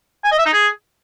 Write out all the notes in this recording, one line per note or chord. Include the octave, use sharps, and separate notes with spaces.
G#5
D#5
E5
D#4
G#4